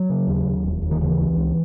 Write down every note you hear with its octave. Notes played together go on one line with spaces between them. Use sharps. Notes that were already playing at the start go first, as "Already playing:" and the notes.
Already playing: F#3
C#3
D#2
D#2
E1
D#2
D#3
C#3 E3
C#2
C#2